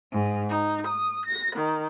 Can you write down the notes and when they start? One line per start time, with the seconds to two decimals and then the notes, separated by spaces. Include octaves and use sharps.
0.12 G#2
0.49 D#4
0.87 D#6
1.25 A#6
1.55 D#3